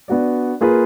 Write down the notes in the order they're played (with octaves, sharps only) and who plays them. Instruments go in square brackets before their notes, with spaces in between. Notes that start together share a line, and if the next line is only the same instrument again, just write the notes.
[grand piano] B3 D4 F#4 D5
A#3 F4 G#4 B4